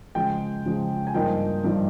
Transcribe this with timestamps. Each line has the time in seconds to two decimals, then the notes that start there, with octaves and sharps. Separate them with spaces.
0.15 C#3 F3 G#3 G5
0.65 C#3 F3 G#3
1.07 G#5
1.14 G2 F3 A#3 D#4 G5
1.64 G2 F3 A#3 D#4